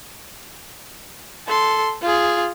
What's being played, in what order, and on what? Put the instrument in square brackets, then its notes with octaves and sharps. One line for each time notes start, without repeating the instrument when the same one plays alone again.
[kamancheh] A4 C6
F4 G#4